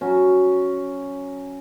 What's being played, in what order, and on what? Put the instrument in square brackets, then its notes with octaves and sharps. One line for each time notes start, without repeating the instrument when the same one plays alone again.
[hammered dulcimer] F#3 C#4 F#4